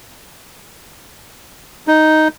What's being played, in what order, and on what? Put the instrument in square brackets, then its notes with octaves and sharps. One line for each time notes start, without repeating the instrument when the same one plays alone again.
[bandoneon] D#4